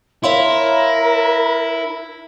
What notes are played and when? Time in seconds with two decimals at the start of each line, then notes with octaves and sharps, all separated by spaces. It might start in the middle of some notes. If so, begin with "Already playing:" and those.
0.24 E4 A#4 C#5 F5 C6